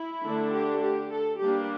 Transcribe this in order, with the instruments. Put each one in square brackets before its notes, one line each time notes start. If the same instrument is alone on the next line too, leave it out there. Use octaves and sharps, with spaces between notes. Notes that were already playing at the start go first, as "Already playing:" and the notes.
Already playing: [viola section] E4
D3 A3 D4
G4
G4
A4
G3 A#3 D4 G4